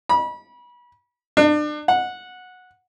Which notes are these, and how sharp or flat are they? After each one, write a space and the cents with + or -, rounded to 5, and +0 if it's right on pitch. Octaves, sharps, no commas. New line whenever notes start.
B5 -30
D4 +35
F#5 -15